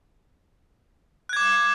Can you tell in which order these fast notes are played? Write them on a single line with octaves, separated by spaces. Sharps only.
F#6 G#6 D6